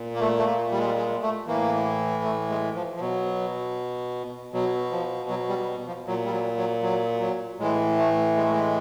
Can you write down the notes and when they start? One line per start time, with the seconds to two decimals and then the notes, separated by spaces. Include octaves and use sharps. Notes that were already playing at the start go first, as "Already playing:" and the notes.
Already playing: A#2
0.14 A#3
0.20 A3
0.38 A3
0.46 A#3
0.71 G3
0.78 G#3
0.86 G3
0.97 G#3
1.22 A3
1.47 A2 E3 A#3
2.23 A3
2.49 G#3
2.75 F3
2.96 F3
3.00 B2 F#3
4.53 B2 F#3
4.92 F3
5.29 F#3
5.49 G3
5.87 F3
6.07 A#2 F#3
6.25 G3
6.31 F#3
6.57 F#3
6.83 F#3
7.21 F#3
7.59 A2 E3 G#3
7.98 A3
8.36 G#3
8.44 A3
8.51 G#3